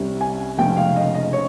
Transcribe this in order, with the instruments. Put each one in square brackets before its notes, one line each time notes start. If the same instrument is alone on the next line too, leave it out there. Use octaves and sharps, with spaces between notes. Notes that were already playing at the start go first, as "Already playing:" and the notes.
Already playing: [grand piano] C2 C3 G3 C#4
G#5
F1 F2 C#3 G#3 C#4 G5
F5
D#5
D#5
C#5